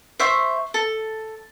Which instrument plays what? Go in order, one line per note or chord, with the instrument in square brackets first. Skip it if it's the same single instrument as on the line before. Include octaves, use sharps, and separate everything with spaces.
[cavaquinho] C5 E5 C#6
A4